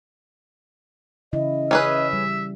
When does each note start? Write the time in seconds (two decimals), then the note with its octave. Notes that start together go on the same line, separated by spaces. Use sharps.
1.33 C#3 E3 E4 D#5
1.71 C#4 G#4 B4 E5
2.13 G3